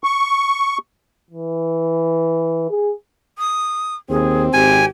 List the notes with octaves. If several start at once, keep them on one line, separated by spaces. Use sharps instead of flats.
C#6
E3
G#4
D#6
D#2 C4 G#4
G#1 G4 G#5